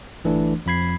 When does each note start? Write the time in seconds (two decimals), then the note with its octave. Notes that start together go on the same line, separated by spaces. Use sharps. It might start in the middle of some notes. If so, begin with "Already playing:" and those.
0.24 G1 E3 A3 D4
0.66 F2 F3 B5 G#6 C7